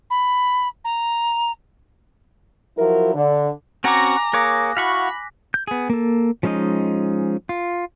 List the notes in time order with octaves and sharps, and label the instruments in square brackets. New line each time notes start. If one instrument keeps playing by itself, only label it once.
[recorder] B5
A#5
[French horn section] F3 F#3 E4 A#4
D3
[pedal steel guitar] C4 C#4 F#4 [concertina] F#5 C#6 [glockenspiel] G#5 D6 [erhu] A#5
[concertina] A#3 G#4 [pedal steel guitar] A#4 C#5 D6 [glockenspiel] F#6 A#6
[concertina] E4 F#4 [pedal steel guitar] F5 F#5 C#6 [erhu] B5 [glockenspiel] B6
[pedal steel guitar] G6
B3 G#4
A#3 A4
F3 G#3 C#4 D#4 D#5
F4